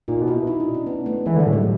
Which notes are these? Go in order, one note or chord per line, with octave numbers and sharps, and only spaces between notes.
A#2 D#4
B2
E4
D#4
D4
C#4
B3
A3
E3 G#3
D3 G3
A2
F#3